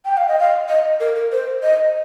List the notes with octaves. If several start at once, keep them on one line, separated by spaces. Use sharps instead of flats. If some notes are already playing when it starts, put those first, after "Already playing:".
G5
F5
D#5
F5
D#5
A#4
A#4
C5
D#5